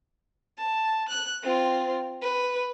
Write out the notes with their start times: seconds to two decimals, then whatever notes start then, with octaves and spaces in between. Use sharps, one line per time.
0.58 A5
1.09 F#6
1.43 C4 F4
2.22 B4